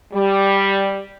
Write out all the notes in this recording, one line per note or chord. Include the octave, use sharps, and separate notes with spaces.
G3